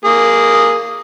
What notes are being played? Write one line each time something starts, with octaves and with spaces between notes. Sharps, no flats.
A#3 G#4